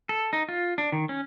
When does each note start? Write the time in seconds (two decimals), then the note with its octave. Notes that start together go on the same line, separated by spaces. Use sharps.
0.09 A4
0.33 D#4
0.49 F4
0.78 D4
0.92 D#3
1.09 C#4